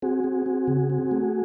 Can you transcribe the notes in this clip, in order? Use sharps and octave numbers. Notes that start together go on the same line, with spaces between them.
C4 F#4 G#4
C4
C4
C#3
C4
A3